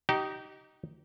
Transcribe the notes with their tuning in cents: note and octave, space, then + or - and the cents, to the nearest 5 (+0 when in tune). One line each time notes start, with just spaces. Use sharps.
D#4 +0 G4 -30